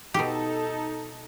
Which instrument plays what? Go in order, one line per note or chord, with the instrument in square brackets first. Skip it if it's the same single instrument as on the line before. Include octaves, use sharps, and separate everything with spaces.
[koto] B2 G4 [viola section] D#4 A4